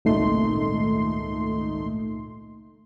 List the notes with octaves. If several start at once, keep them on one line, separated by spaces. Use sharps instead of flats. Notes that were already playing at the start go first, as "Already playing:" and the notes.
G#1 C#2 A#2 A3 D#4 C6